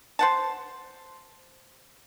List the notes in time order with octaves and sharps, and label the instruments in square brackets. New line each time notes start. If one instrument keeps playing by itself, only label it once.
[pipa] C5 F#5 A5